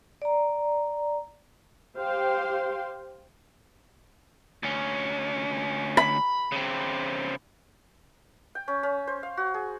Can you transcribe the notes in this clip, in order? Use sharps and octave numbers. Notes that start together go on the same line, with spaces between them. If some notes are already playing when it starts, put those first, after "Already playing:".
D5 A#5
G4 C5 F5 G5 C6
D2 C#4
B5
C#3 C4
G5
C#4
C#4
C5
F5
F#4
G#4